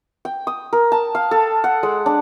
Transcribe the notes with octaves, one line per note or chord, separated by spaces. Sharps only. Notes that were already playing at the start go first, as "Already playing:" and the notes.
G5
D#6
A#4
A5
F5
A4
F#5
G#3
D4